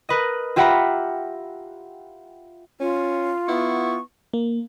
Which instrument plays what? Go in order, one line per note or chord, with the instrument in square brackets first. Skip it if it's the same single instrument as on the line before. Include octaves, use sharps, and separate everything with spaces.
[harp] A#4 B4 D#5
F4 G4 E5 F#5 A#5 B5
[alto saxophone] C#4 [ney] F4
[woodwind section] B3 C#6 [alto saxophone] E4
[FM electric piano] A#3